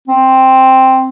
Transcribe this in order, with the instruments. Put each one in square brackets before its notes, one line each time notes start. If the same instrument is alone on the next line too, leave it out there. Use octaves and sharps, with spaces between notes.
[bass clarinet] C4